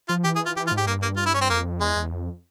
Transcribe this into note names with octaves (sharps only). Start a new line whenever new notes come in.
F3 F4
E3 G4
G#4
F4
E3 G4
F4
G#2
G4
G2 A#3
A#3
F4
E4
C#4
C4
F2 A#3
E2 G#3
E2
F2